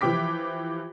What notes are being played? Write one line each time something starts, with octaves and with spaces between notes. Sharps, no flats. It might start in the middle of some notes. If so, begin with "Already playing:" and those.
E3 F3 G4 G5 D6 B6